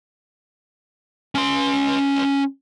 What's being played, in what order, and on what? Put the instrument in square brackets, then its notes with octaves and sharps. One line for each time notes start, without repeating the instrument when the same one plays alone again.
[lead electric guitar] C#4 C6